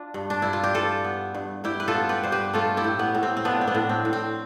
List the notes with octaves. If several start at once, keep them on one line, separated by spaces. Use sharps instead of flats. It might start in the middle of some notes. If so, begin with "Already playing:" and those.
Already playing: D4 F4
G2
D4
G2 E4
F4
G4
E3 F4 A4
B3
G2
G2 E4 G4
B4
F4 A4
B3
G4 B4
G2 C5
G4 B4
A3 F4 A4
E4 G4
A2
B3
A2
C4
C4
F3 B3 D4
C4
B3 D4
A2
C4
A2
C4